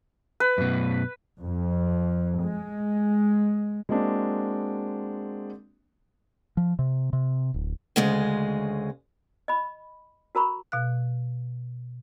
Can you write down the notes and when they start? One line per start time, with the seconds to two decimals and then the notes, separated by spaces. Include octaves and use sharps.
0.40 B4
0.58 F#2 B2
1.41 F2
2.42 G#3
3.89 G#3 A#3 C4 D4 F#4
6.57 F3
6.79 C3
7.13 C3
7.54 D1
7.96 D2 C#3 G#3 D#5
9.48 D#5 B5
10.35 F#4 A#4 A#5 B5 C#6
10.72 B2 F5 F#6